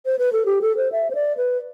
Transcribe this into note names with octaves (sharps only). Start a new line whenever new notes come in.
C5
B4
A4
G4
A4
C5
E5
C5
D5
B4